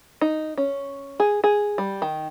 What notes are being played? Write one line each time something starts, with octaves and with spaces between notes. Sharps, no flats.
D#4
C#4
G#4
G#4
G3
D#3